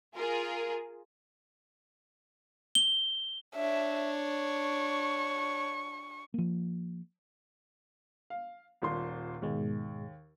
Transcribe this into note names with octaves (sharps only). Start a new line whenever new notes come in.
F4 G#4 A#4
G7
D4 C#5 E5
C#6
F3 A#3
F5
D#1 A#2 C6
D#2 G#2 B2 G#3